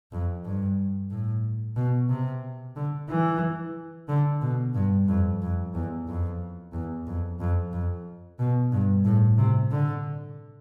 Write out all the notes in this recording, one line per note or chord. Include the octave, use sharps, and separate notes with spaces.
F2
G2
A2
B2
C3
D3
E3
D3
B2
G2
F2
F2
E2
F2
E2
F2
F2
F2
B2
G2
A2
C3
D3